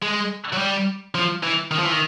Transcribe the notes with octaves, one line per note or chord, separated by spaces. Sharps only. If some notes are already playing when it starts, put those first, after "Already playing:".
G#3
F#3
G3
F3
E3
D#3
F3
E3
D#3